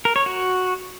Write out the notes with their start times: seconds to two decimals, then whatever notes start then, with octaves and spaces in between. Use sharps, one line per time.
0.05 A#4
0.16 C#5
0.26 F#4